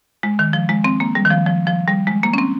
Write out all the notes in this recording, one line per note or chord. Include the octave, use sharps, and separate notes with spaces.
G#3
D#3
F3
G#3
C4
A#3
G3
D#3
F3
F3
F3
G3
G#3
A#3
C#4
C4